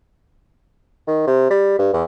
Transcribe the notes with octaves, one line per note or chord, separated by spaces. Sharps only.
D#3
C3
G3
G2
E2